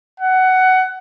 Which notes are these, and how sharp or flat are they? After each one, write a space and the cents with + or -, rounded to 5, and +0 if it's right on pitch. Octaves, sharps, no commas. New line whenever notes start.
F#5 +15